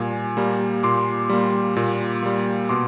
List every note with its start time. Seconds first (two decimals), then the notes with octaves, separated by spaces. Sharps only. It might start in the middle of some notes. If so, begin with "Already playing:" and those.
Already playing: A#2 G3 A#3 G#5
0.37 G3 A#3
0.83 A#2 C6 D6
1.29 G3 A#3
1.76 A#2
2.23 G3 A#3
2.69 B2 C6 D6